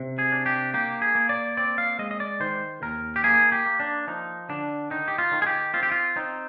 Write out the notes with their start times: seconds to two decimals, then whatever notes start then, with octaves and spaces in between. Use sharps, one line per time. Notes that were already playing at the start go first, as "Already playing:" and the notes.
Already playing: C3
0.19 G#4
0.32 D4
0.46 G4
0.74 A#3 G4
1.02 G#4
1.15 A#3
1.29 D5
1.57 C4 D5
1.78 F5
1.99 G#3 D#5
2.11 D#5
2.20 D5
2.40 D#3 C5
2.82 D#2 A#4
3.16 G4
3.24 A#3 G#4
3.52 G4
3.66 A#3
3.80 D4
4.07 F3 D#4
4.49 D3 D4
4.90 D#3 D#4
5.08 G4
5.18 F4
5.32 D#3
5.42 G#4
5.46 G4
5.74 C4 F4
5.83 G4
5.92 F4
6.16 C4 D#4